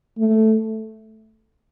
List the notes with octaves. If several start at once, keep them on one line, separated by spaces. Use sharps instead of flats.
A3